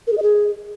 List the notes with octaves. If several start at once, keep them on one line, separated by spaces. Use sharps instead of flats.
A#4
G#4
D#5
G#4